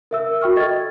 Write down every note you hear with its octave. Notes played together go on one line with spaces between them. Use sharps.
A#4 E5 E6
F#4 G5 C#6 F6
A4 D#5 G#6 A6